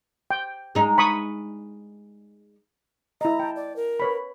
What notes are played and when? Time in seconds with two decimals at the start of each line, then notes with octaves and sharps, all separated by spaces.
0.30 G5
0.75 G#3 D#4
0.98 B5 C#6 D#6
3.21 E4 D#5 A#5
3.40 G5 A5
3.56 D5
3.76 A#4
4.00 B4 C#5 B5